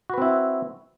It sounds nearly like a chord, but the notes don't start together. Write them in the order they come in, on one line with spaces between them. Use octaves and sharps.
F#4 B4 C4 E4